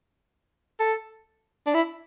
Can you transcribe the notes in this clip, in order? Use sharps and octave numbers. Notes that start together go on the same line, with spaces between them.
A4
D4
E4